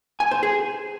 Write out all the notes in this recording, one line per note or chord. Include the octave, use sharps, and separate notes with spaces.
G#5
C5
G#4